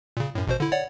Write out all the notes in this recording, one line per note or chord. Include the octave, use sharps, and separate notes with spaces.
A#2 C#3
F#2 A2
A1 B2 C5
D3 E4
C#5 D5 F#5